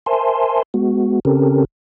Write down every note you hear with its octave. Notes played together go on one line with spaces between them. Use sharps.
A#4 C5 E5 G#5 A5 C6
G#3 B3 F#4
C#3 C4 C#4 G4 A4 A#4